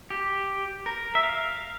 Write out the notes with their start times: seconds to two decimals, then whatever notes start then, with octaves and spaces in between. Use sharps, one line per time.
0.10 G4
0.86 A#4
1.15 E5
1.23 F5